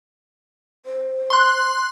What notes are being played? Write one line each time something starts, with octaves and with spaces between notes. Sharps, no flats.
C5
C6 F#6